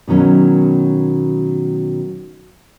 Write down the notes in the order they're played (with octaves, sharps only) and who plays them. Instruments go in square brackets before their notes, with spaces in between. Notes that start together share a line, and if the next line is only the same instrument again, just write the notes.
[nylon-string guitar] B2 D#3 F#3 C#4